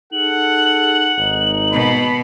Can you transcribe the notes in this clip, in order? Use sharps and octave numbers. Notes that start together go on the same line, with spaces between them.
D#4 G#4 A4 F#5 F#7
G#1 D#4
B2 B5